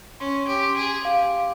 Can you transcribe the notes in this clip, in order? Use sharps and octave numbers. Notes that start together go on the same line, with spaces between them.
C#4 C6
G4
C6
G#4
G4 F5